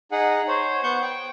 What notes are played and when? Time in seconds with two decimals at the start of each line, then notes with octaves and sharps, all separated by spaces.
0.12 D#4 G#4 F#5
0.48 C5 C#5
0.83 B3 C5 F#5 C#6 G6
1.02 G5